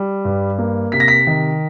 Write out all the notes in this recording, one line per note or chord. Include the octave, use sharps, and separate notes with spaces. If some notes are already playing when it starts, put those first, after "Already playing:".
Already playing: G3
G2
A#3
C3 B6
A#6
B6
D#3